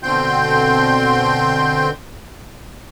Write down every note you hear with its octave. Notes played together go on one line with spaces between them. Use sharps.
B2 D3 C4 G5 C6 G6